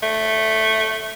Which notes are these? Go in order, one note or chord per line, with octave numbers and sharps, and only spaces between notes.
A3